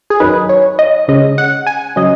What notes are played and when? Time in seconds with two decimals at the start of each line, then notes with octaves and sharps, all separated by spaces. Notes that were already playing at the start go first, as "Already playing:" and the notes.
0.10 G#4
0.20 F#2 D#3 F#3 D#4 B4
0.49 C#5
0.79 D#5
1.08 C#3 G#3 C#4 D#5
1.38 F#5
1.67 G#5
1.96 C#3 F#3 C#4 D#5